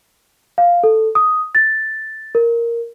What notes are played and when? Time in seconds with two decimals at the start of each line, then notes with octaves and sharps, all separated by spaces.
0.58 F5
0.84 A4
1.15 D#6
1.55 A6
2.35 A#4